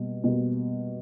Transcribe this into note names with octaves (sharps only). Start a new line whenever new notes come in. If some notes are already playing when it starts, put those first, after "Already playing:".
Already playing: B2 G3 A#3
B2 G3 A#3